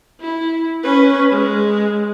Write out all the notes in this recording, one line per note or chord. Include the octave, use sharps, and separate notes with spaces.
E4
C#4 B4
G#3